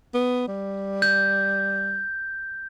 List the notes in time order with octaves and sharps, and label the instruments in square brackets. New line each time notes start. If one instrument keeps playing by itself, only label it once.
[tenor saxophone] B3
G3
[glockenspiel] G6